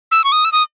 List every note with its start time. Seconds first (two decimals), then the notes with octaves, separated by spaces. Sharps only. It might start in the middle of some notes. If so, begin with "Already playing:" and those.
0.11 E6
0.24 C#6
0.32 D#6
0.45 E6
0.52 D#6